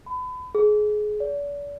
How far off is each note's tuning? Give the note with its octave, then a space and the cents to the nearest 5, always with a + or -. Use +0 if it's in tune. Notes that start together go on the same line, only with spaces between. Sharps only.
B5 +35
G#4 +25
D5 -40